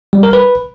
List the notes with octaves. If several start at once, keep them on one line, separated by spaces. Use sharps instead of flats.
G3
A#4
B4